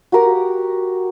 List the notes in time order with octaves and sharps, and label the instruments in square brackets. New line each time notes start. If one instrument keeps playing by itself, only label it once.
[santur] F#4 G4 A#4 A#5